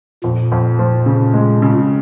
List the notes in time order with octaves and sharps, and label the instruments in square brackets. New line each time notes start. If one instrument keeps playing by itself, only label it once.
[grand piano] F2 [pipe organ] A#2
[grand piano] F2
F3
C#3
G#3
C#3